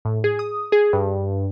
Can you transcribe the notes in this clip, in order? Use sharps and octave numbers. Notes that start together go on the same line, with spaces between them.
A2
G#4
D#6
G#4
G2